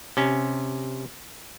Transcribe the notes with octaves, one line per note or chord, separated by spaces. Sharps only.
C3 C#4